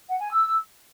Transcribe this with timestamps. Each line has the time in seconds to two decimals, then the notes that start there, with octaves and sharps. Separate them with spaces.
0.09 F#5
0.20 G#5
0.31 E6